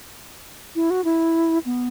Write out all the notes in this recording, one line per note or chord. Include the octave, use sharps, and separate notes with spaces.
E4
F#4
E4
B3